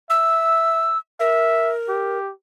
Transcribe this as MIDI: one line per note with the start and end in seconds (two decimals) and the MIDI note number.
0.10 0.94 76
0.10 0.98 88
1.20 2.18 70
1.20 1.73 76
1.89 2.32 67